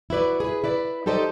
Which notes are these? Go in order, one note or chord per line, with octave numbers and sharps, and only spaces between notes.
E4 F#4 B4 D5
G#4 B4
E4 B4 D5
D#4 G4 A4 C5 D5 D#5